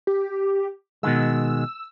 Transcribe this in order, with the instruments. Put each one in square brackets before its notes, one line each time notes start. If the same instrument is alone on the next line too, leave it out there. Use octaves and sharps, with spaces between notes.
[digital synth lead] G4
[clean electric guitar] B2 D#3 G#3 [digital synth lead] E6